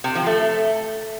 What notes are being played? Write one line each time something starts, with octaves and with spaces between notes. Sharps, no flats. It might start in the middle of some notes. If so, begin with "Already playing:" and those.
C3
F3
A3